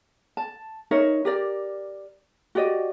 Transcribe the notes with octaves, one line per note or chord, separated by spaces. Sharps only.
A5
D#4 A#4 C#5 E5
G4 A#4 D5
F#4 G4 D5 D#5